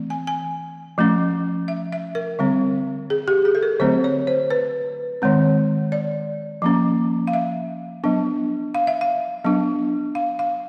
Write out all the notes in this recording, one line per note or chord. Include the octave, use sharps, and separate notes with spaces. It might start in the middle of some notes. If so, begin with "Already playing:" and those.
Already playing: E3 A3 C4
G#5
G#5
F3 A3 C#4
E5
E5
A#4
D3 G3 C4
G#4
G4
G#4
A4
A#4
D3 F#3 A3 C4 C5
C#5
C5
B4
D#3 G#3 C4
D5
F3 A#3 C#4
F5
E5
F#3 B3 D4
F5
E5
F5
F#3 B3 D4
F5
F5